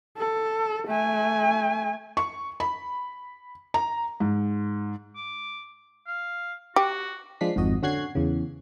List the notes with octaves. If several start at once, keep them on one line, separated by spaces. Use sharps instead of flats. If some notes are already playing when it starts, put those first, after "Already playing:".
A4
A3 G#5
C#6
B5
A#5
G#2
D6
F5
F#4 G4
F3 G#3 D4 B6 C7
G#1 F2 F#4 D#5
D3 C#4 F#4 F#6 G#6 C7
E2 C#3